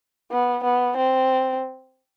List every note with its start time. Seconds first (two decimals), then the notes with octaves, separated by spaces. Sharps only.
0.31 B3
0.64 B3
0.97 C4